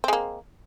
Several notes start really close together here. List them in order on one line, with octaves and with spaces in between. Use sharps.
C4 G#3 A#3